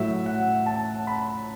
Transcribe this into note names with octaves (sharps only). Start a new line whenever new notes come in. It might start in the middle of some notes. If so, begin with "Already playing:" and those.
Already playing: A2 F#3 E5
F#5
A5
B5